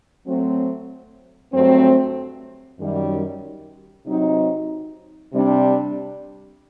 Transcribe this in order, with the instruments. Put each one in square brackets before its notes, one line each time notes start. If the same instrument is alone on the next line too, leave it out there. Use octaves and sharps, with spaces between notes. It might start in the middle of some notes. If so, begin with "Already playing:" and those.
[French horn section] F#3 A3 C4
G2 F#3 A3 C4
F#2 D#3 G3
C3 F#3 C4 D#4
C3 G3 D4